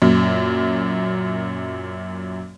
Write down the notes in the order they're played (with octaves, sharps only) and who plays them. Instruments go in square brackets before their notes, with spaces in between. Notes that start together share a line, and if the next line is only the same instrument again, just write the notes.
[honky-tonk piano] F#2 A#2